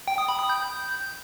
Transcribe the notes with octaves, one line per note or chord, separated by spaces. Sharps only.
G5
D#6
B5
D#6
G6